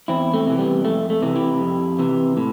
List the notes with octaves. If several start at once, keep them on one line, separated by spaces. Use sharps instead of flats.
E2 C4 E4
A3 C4
C3 E3
G3 B3
F2 A3
A3
C3 E3
E4 G4
F2
C3 E3
A2